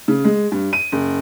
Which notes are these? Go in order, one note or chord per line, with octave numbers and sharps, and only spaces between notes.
C#3
G#3
G2
D#7
F#1